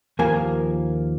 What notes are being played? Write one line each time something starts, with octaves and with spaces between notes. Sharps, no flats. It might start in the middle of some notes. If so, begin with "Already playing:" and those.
D#2 F3 A#3 G#5